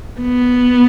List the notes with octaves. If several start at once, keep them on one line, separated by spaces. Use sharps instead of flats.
B3